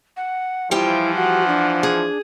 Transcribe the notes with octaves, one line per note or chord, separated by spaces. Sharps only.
F#5
E3 F3 G3 E4 G4 G5
F#4 F#5
D4
G#4